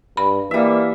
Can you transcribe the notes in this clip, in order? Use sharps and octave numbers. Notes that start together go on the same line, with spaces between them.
G2 B5
E3 G3 A#3 E5